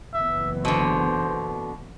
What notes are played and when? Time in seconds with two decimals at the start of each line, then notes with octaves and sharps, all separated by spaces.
0.14 F#1 E3 B3 E5
0.65 B2 D3 C5